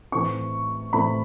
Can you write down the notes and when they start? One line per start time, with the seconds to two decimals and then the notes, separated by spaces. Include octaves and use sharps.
0.12 A2 E3 A3 C4 C#6
0.93 A2 E3 A3 C4 B5